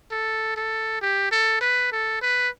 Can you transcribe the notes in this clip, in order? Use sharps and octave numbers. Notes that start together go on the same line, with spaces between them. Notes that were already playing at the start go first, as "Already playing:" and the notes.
A4
A4
G4
A4
B4
A4
B4